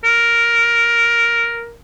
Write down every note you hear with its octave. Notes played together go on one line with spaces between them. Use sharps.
A#4